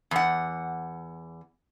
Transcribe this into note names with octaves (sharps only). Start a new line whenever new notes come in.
E2 F#5